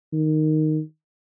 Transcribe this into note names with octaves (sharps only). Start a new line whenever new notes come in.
D#3